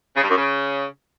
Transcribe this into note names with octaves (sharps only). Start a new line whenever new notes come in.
C#3
G2
F#2
C#3